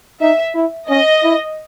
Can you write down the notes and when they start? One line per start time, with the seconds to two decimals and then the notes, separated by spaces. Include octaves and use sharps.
0.21 D#4 E5
0.55 E4
0.89 C#4 D#5
1.24 E4